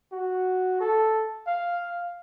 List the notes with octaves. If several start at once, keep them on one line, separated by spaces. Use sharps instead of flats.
F#4
A4
F5